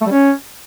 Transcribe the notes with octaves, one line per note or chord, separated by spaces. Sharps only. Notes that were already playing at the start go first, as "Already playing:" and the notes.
A3
G3
C#4